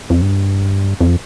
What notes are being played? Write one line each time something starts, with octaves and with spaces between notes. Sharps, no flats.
F2
G2
F2